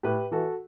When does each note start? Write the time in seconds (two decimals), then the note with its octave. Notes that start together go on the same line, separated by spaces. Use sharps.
0.03 A2 G4 B4
0.31 E3 F#4 A4